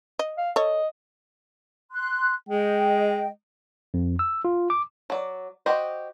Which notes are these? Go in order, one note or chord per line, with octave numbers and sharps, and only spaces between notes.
D#5
F5
A4 C#5 D#5
C6 F#6
G#3 D#5 G5
F2
E6
F4
D6
F#3 D5
F#4 G4 C5 D#5